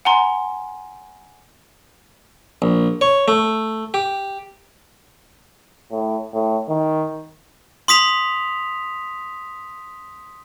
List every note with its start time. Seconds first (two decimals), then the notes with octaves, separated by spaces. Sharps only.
0.05 F#5 G#5 A#5 C6
2.62 A#1
3.01 C#5
3.28 A3
3.94 G4
5.91 A2
6.33 A2
6.69 D#3
7.88 C6 D#6 B6 F7